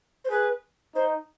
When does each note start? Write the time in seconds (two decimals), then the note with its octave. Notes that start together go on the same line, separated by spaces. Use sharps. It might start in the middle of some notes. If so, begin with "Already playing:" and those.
0.24 C5
0.30 G#4 B4
0.95 D#4 C5